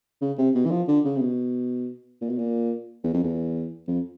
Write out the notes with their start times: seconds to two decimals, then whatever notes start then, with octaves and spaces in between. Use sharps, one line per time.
0.21 C#3
0.38 C3
0.55 B2
0.66 E3
0.71 F3
0.88 D3
1.05 C#3
1.16 C3
1.21 B2
2.21 A#2
2.29 B2
2.38 A#2
3.04 E2
3.14 F2
3.23 E2
3.87 F2